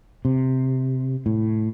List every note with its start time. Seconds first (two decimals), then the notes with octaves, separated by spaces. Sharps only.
0.25 C3
1.26 A2